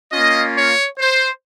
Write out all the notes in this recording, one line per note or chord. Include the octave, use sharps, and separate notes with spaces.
A#3 C#4 F4 D#5
C#5
C5